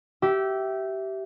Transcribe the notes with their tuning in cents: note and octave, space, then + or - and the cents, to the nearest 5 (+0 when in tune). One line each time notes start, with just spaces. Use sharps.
G4 -20 E5 +0